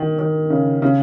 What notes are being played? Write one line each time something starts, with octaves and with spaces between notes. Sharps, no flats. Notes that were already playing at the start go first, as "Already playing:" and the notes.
Already playing: D#3
D#3
C#3
C#3